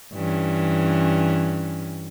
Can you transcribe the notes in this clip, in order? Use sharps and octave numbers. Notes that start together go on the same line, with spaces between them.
G2 E3 C#4